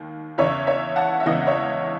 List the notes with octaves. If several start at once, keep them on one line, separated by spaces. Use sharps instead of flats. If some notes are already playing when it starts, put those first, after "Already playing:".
Already playing: D#2 D#3
E2 C#3 E3 C#5 E5
C#5 E5
F#5 A5
E5
E2 C#3 E3 D#5 F#5
C#5 E5